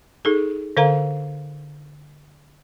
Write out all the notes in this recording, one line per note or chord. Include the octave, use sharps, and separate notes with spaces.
D#4 G#4 A4
D3 A4 A#4 F5 A#5